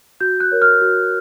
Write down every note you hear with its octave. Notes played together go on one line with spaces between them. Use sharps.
F#4 G6
F#6
A#4 C#5
F6
F#4